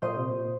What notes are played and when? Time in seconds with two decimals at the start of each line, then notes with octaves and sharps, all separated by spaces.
0.02 A#2 C5 D#5
0.16 C3
0.29 A#2